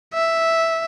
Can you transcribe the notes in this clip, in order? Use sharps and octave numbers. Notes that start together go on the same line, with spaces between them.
E5